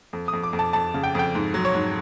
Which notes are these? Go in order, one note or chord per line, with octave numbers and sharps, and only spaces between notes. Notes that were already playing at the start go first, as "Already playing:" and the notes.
F2
D#6
F2
D6
F2
A5
F2 A5
C#3
G5
F2 G5
G#2
F#3
C#5
G#2